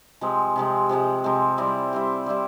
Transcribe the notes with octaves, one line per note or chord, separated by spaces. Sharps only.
C3 F3 G#3 C4
C3 F3 G#3 C4
C3 F3 G#3 C4
C3 F3 G#3 C4
G3 C4 E4
G3 C4 E4
G3 C4 E4